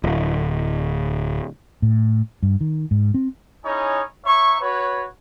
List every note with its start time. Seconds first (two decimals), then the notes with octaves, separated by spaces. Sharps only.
0.04 D1
1.82 A2
2.43 G2
2.61 D#3
2.91 G#2
3.14 C4
3.65 C#4 D#4 E4 G#4 C#5
4.25 D#4 C#5 E5 C#6
4.61 F#4 B4 C#5